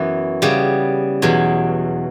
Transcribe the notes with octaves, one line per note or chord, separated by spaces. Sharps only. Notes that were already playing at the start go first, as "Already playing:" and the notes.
Already playing: F#2 E3 B3 F#4
C#3 G3 B3
E2 B2 F#3